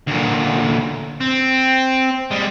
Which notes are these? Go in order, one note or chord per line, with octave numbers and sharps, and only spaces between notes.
D2 A#2
C4
G3 G#3